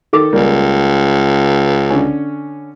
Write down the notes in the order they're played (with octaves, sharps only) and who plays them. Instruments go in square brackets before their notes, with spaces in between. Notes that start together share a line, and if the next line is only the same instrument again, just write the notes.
[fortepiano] D#3 A4 D6
[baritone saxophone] C#2 [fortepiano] G3 A#3
[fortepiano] D3 C#4